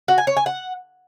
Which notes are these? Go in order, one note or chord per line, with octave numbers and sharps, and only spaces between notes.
F#4
G#5
C#5
G#5
F#5